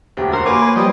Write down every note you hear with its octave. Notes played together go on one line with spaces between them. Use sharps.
E1 D2 G4
F#4 A#4 C5 C6
A#3 B4 C#5 G#5 C6 D6
F3 G3 C5 D#5